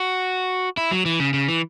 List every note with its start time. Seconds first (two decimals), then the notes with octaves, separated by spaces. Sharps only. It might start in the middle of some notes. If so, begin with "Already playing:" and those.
Already playing: F#4
0.77 E4
0.91 F#3
1.06 E3
1.20 C#3
1.34 C#3
1.48 E3